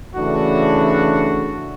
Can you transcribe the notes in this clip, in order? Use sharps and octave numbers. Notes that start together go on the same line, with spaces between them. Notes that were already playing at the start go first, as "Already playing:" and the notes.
C#3 E3 A3 D4 F#4